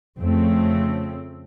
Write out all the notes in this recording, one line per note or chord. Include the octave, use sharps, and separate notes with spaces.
F2 C#3 A3 C4